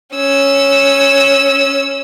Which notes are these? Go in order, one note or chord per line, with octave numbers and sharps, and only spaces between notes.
C#4 E6